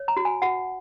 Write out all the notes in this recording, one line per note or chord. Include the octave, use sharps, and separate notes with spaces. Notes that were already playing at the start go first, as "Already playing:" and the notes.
Already playing: C#5
A#5
F#4
G#5
F#4 F#5